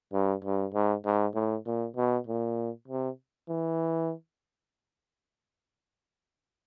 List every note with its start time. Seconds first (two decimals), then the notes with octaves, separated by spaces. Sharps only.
0.13 G2
0.45 G2
0.74 G#2
1.05 G#2
1.35 A2
1.66 A#2
1.96 B2
2.27 A#2
2.88 C3
3.49 E3